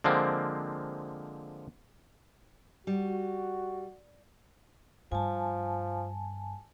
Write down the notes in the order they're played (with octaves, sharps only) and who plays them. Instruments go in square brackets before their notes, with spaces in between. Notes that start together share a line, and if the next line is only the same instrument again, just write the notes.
[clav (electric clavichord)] D3 F3 G#3 A#3 C4
[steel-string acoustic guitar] G3 [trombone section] F#4
[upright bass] G2 [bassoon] F3 [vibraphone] G#5 A5